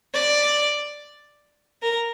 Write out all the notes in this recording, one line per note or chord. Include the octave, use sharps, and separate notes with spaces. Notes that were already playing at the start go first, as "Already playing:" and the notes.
D5
A#4